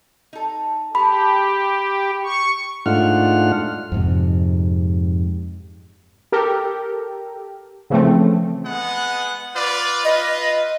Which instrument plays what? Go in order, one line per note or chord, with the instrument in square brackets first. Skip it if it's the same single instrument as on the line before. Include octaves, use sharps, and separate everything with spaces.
[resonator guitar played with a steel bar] D#4 A4
[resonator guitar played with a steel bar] G#3 A4 [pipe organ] G4 [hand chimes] B5
[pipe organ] C#6
[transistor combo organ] G#2 A3 D4 F4 F#5 F6
[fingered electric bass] F2 G#2 C3
[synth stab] G4 A4 A#4
C#3 E3 F3 A3 C4
[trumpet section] G#3 B3 F#5
F4 B4 D5
[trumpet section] F4 B4 [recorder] D#5